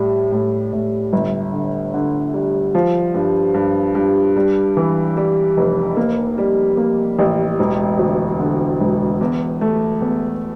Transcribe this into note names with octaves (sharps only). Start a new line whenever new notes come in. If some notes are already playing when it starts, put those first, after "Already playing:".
Already playing: A2 G3
A2
A2
G1
D3
D3
G3
F3
G2
G2
G2
G3
E3
G3
F1
A#3
G3
A#3
A1
E1
D2
D3
E1
E2
A3
E2